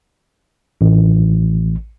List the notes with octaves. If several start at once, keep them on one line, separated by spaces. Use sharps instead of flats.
A1